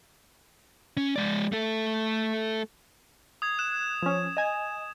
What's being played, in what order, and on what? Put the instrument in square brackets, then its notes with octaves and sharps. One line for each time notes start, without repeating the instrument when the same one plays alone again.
[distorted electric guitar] C#4
G#3 D5
A3 A4
[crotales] D#6 G#6
[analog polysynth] F#6 [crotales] E7
[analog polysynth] F3 C#4
D#5 G#5